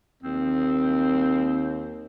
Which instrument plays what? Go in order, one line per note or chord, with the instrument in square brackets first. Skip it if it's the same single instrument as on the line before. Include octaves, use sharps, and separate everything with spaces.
[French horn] D#2 [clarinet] C4